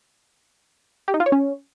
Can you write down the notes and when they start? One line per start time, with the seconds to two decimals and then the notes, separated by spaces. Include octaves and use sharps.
1.08 G4
1.14 D#4
1.20 F4
1.26 C#5
1.32 C#4